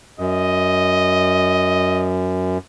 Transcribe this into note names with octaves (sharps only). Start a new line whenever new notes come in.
F#2 D#5